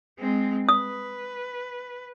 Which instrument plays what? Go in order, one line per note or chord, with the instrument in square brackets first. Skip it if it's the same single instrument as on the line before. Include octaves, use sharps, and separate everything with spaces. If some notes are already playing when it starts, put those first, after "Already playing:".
[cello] G#3 C4
[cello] B4 [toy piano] D#6